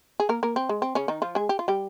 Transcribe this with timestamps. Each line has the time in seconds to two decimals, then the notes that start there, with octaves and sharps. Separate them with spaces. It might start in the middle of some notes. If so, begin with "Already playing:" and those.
0.20 G#4
0.29 A#3 A#4
0.43 A#3 A#4
0.56 C4
0.69 G#3
0.82 C4
0.95 C#3 C#4
1.08 D#3 D#4
1.22 F3 F4
1.35 G#3 G#4
1.49 G4
1.59 F4
1.68 G3 G4